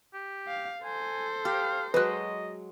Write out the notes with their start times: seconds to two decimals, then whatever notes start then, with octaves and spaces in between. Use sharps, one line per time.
0.14 G4
0.48 F5
0.84 A4 C5 G#5
1.45 G4 F5
1.94 F#3 G#3 B4 D#5 F#6